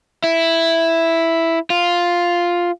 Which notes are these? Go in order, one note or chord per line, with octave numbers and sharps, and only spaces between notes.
E4
F4